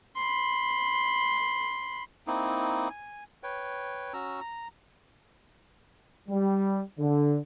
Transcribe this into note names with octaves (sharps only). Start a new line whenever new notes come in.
B5 C6
A#3 C4 D#4 E4
G#5
B4 C#5 G5
C#4 F#4 A#5 E6
A#5
G3
D3